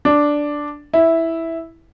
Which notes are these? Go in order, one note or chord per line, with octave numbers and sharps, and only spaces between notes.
D4
E4